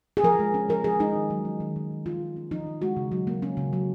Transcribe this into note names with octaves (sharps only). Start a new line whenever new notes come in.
G#4
F3 A#4
G#3
C#4
F3 A#4
F3 G#4
G#3 D#4
D#3
F#3
C#4
D#3
D#3
F#3
F3 F4
G#3
C#4
F3 D#4
F3
G#3 F#4
C#3
F#3
A#3
C#4
C#3
F#3